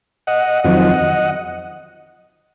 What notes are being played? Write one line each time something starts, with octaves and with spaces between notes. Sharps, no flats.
D#5 F#5
F2 D#3 F#3 C4 D#5 F#5